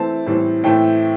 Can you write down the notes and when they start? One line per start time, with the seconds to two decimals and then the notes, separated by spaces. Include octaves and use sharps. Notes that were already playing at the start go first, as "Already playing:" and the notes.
Already playing: E3 A3 C4 A5
0.26 A2 E3 G3 C4
0.64 A2 E3 A3 C4 G5